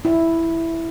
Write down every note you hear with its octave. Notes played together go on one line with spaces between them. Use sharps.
E4